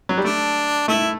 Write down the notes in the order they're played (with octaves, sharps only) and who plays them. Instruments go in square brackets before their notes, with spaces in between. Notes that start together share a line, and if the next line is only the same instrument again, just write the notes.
[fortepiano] F#3
G3
[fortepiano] A3 [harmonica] D4
[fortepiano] A3 [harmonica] E4